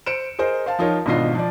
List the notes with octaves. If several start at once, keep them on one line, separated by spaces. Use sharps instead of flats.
C5 C#7 D7 E7
G#4 A#4 C5 D#5
C5 F5 A5
F3 D#4 F4 A#4 C#5
G#1 B2 D4 F4 D#5 C7
F3 D5